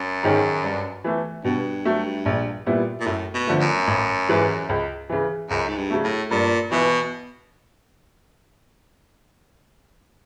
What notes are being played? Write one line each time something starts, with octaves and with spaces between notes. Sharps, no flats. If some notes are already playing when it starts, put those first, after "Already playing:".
Already playing: F#2
G#2 D#3 G#3 C#4
G2
E3 A3
G2 B2
F#3 A3
A#1
A#2 G3 B3 E4
A#2
F#2 A2
B2
D3 F3 A3
F#2
A1
G#2 E3 G#3
C#2
C#3 E3
C#2 F#2
G#2
G2
C#3 F#3 A3
A2
G2 A#2
B2 E3